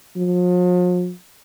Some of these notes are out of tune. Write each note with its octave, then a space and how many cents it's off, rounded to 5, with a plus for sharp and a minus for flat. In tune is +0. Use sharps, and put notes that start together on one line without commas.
F3 +45